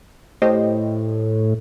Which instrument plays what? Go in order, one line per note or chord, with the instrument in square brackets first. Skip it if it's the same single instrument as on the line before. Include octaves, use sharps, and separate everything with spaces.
[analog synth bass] A2 [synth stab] G4 C5 D#5